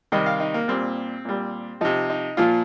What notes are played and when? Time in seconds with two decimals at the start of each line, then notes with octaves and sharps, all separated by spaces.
0.12 C3 D#3 G3 D#5
0.26 F5
0.40 D#4
0.54 A#3
0.68 A#2 G3 C4
1.25 A#2 G3
1.81 C3 F3 D#4
2.10 D#4
2.37 A#2 F3 F4